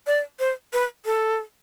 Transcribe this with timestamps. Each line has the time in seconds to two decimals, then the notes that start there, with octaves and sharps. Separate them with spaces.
0.07 D5
0.39 C5
0.73 B4
1.06 A4